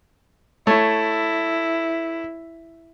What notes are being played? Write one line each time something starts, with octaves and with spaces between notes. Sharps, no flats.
A3 E4 C#5